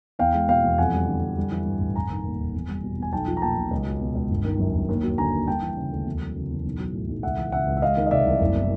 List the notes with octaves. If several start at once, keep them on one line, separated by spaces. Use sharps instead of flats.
E2 F5 G5
G#3
B2 F5 G5
E2
F2 F#5 G#5
G3
D3
F2
G3
E3
G2
A1
F1 G#5 A#5
D#3
D#2
F1
E2
G3
B2
E2 G#5
B1 G5 A5
F3
A#5
A#2 G5 A5
B1
C#2
F#3
B2
C#2
G1
D#3
F#2
G1
D#2
F#3
D3 G#5 A#5
D#2
G3 G5 A5
E3
C#3
D2
E2
F#3
C#3
E2
B1
F#3
A2
B1
C#2 E5 F#5
E3
C#3 E5 F#5
C#2
E5
G#3 D#5 F5
D#3
D#5
C3 D5 E5
C2
F#1
B2